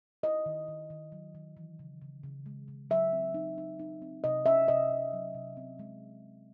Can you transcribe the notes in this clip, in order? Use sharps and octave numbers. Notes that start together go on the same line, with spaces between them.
E4 D#5
D#3
D#3
D#3
F#3
D#3
E3
C#3
C#3
C#3
G#3
C#3
F#3 E5
C4
D#4
D#4
D#4
C4
C3 D#5
C#4 E5
C3 D#5
C3
F#3
C3
C4
G#3